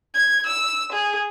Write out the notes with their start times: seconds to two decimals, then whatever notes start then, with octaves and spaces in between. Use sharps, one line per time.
0.15 G#6
0.46 E6
0.92 G#4